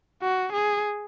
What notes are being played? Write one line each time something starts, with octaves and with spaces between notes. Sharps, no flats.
F#4
G#4